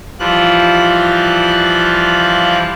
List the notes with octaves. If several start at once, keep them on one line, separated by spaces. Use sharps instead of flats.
E3 F3 G3 F4 F#6